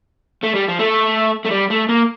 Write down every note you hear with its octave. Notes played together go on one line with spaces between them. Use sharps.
A3
G3
F3
A3
A3
G3
A3
A#3